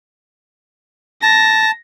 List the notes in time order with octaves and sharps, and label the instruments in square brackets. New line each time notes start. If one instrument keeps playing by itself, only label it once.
[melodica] A5 [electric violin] A#6